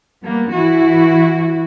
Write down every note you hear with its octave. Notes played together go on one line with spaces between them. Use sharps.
G3 A#3 B3
E3 E4 F#4